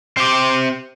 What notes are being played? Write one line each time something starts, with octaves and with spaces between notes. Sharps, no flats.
C4 G4